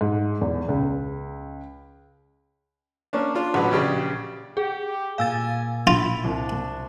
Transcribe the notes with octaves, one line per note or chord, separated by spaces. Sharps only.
G#2
E2
C#2
A#3 C#4 D4
D4 F4
A1 D3 F#3 B4
A#1 C#3 G4 D5
G4 G#4
A#2 F5 G#5 E6 G6 A6
E4 F4
C2 D4